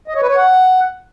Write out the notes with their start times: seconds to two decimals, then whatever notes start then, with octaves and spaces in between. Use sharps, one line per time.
0.08 D#5
0.15 C#5
0.22 B4
0.29 C#5
0.36 F#5